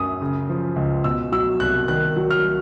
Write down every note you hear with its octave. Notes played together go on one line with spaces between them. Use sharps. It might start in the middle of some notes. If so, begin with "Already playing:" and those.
Already playing: F#2 D#6
C#3
F3
C#2
B2 E6
F#3 E6
C2 F#6
D#3 F#6
F#3
F6